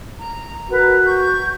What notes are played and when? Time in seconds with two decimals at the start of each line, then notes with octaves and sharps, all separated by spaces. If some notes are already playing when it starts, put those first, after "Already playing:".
0.19 A#5
0.70 F#4 A#4 B4 A#5
1.06 C#6 G6